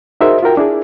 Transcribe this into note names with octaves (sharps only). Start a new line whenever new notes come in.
D#4 F#4 G#4 A#4 C5 E5
F4 F#4 A#4 G5
D4 E4 G#4